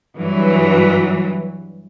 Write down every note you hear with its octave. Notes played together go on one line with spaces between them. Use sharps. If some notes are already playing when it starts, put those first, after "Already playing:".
G2 E3 F#3